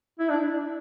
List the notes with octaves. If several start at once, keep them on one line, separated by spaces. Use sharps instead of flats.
E4
D4